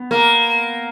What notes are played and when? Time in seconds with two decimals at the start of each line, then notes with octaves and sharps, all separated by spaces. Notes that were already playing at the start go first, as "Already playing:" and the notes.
Already playing: B3
0.11 A#3